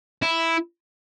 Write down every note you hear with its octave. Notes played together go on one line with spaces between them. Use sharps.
E4